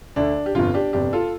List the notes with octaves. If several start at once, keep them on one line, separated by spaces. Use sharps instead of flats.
D2 D3 D4
G4
G1 F2 D3 F4
D4 G4
G1 F2 C3 D4 G4
F4 A4